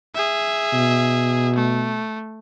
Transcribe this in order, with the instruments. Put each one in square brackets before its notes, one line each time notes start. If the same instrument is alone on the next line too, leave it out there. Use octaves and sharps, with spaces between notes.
[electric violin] G#4 E5
[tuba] B2
[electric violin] A3